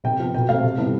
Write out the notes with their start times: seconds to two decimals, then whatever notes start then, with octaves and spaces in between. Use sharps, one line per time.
0.04 C3 G5
0.20 F3 B3
0.34 B2 G5
0.49 A3 C4 F5
0.63 C3
0.78 E3 G3 B3